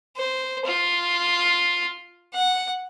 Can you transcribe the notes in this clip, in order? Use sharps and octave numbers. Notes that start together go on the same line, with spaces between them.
C5
F4
F#5